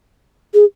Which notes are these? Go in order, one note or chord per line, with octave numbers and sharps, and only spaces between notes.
G#4